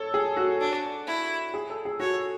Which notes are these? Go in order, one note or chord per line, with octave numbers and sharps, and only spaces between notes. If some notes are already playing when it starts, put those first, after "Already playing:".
Already playing: A4 C#5
G#4
F#4
D4
E4
G#4
A4
G#4
F#4 C#5